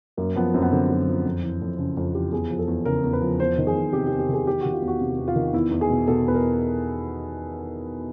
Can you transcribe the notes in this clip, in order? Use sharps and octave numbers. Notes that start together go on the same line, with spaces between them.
F#2 A#3
F3 B3
F#2 C4
B3
D3 C4
F#2
F3
F2
E3
F2
C#3 C#4
F2
E3 G4
E2 G#4
F3
A4
E2
C#3 A#4
E2
B4
F3
E2 C5
D#3
G#4
E2
C3 G4
G4
E2
G4
D#3 G#4
E2 G4
D#3 F#4
F4
E2
F#4
C3
E2
F4
D#3
E2 E4
E2
G#4
B2
B2 A4
E2 B4
A#4